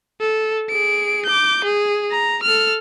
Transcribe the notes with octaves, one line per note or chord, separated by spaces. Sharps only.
A4
G#4 D7
D6 G6
G#4
A#5
A4 F6